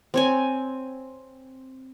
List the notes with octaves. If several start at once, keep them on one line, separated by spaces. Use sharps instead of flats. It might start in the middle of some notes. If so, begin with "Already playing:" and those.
C4 C#5 G#5